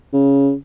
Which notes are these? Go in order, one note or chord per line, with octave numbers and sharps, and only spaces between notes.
C#3